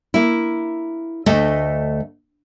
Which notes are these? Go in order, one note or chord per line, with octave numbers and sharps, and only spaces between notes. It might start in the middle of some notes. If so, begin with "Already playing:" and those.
A#3 E4
D2 A3 D#5 E5